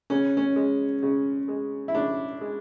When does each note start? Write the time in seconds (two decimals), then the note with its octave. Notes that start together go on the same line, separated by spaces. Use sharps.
0.10 C#3 C#4
0.37 C#4
0.56 G#3
1.03 C#3
1.48 G#3
1.88 E4
1.95 C#3 D4
2.41 G#3